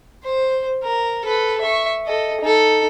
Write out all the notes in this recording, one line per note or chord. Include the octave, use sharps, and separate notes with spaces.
C5
A#4
A4 B4
E5 C#6
A4 D#5
D#4 A4